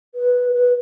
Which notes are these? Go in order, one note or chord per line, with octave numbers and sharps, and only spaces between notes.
B4
B4